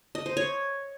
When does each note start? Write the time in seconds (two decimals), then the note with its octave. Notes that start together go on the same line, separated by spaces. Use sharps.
0.15 D#5
0.26 C5
0.37 C#5